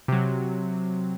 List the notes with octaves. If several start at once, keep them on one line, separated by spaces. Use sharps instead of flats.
C3 F#3